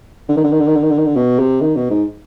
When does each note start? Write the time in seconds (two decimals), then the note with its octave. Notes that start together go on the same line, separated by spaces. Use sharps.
0.29 D3
0.37 D#3
0.44 D3
0.52 D#3
0.60 D3
0.67 D#3
0.76 D3
0.83 D#3
0.91 D3
0.98 D#3
1.06 D3
1.16 B2
1.40 C3
1.61 D#3
1.76 B2
1.90 G#2